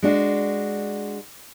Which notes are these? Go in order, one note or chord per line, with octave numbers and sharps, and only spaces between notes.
G#3 D4 F#4